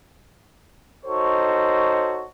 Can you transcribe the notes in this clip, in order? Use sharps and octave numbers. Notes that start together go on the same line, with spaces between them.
D#4 F#4 A4 C5 C#5